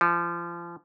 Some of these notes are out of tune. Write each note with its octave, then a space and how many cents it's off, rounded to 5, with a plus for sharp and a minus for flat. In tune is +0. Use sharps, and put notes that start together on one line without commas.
F3 -30